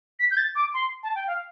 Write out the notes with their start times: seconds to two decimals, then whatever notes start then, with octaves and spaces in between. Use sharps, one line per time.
0.19 B6
0.31 G6
0.37 A6
0.55 D6
0.74 C6
1.03 A5
1.15 G5
1.27 F5